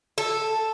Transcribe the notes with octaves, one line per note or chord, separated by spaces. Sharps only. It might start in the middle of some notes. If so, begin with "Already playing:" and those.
A4